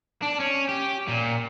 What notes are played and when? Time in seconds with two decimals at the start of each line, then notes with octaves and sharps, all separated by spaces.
0.22 D4
0.40 C#4
0.69 G4
1.08 A#2